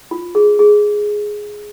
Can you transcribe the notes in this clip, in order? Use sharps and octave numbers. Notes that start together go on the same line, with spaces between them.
F4
G#4
G#4